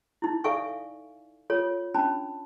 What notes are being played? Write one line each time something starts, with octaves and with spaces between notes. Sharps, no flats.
D#4 E4
A4 D5 E5 F5 G#5 C#6
F4 A4 C#5
C#4 D4 A5 B5